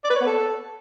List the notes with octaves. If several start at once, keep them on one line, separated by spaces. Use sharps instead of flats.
D5
B4
C#5
B3
A4